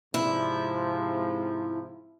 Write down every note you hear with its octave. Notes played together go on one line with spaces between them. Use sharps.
G#2 C3 F3 E4